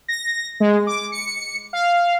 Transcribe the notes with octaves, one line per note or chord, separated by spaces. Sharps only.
A#6
G#3
D6
C#7
F5